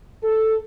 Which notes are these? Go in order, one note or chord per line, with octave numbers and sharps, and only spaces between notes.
A4